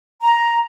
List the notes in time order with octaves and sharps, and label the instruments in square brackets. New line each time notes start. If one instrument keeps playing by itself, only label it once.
[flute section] A#5